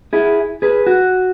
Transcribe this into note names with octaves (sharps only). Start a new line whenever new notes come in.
E4 G#4
G#4 B4
F#4